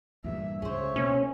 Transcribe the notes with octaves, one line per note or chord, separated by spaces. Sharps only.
E2 G2 A#2 E5
C#2 C#3 G#4 C5 C#5 E5
B2 A#3 C#4